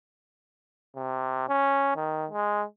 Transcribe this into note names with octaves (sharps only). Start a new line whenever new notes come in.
C3
C#4
D#3
G#3